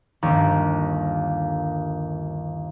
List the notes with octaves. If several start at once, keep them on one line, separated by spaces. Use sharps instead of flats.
G1 D#2